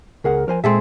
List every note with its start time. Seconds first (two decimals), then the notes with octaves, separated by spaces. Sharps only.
0.24 C#2 G#4 A#4 F#5
0.48 F3 A#4 C5 G#5
0.64 A#2 G#3 C4 G#4 A4 E5